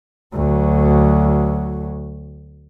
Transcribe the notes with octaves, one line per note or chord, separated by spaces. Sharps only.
D2 F#3